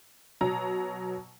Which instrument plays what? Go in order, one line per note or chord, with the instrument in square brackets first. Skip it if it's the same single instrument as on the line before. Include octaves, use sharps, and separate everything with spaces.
[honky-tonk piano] B2 F#3 A#5